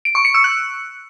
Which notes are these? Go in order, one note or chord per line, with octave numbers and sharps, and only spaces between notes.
D7
C#6
C#7
E6
F#6